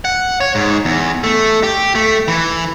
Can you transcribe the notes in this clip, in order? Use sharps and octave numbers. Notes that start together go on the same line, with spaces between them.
F#5
C#5
G#2
E2
A3
G4
A3
E3